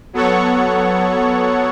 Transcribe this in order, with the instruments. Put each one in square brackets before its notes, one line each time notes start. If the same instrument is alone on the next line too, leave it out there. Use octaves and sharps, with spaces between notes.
[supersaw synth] F#3 B3 A4 C#5 F#5 C#6